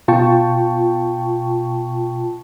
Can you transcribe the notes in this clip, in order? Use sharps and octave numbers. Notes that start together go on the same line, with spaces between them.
B2 F4 G5 A5 C#6